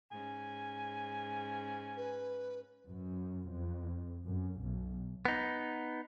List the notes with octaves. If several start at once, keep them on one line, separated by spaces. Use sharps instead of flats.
G#2 C#4 G#5
B4
F#2
F2
F#2
B1
B3 D#4